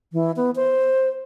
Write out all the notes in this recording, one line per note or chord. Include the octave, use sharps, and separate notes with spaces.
E3
B3
C5